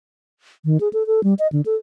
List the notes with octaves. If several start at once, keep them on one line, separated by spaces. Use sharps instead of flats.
D#3
G#4
A4
A4
G3
D#5
D3
A4